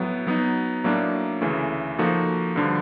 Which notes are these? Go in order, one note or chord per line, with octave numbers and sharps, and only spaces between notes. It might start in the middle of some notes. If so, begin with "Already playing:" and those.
Already playing: A2 F#3 B3
F#3 B3 D#4
A2 F#3 A#3 D4
D2 C#3 E3 A3
F3 A#3 D#4 F#4 A4
G2 D3 F3